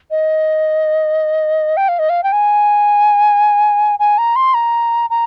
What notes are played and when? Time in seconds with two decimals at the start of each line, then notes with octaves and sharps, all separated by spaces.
0.11 D#5
1.77 G5
1.88 F5
1.99 D#5
2.09 F5
2.24 G5
2.32 G#5
3.99 G#5
4.18 A#5
4.36 C6
4.54 A#5
5.10 A#5